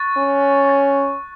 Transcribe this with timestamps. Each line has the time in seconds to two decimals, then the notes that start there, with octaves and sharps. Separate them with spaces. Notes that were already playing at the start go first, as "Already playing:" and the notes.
Already playing: C#6 F#6 A6
0.18 C#4
0.65 C#6 F#6 A6